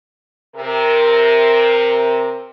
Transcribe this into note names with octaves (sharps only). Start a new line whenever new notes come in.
C3 A#4